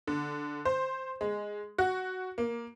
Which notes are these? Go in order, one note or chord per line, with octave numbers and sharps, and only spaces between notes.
D3
C5
G#3
F#4
A#3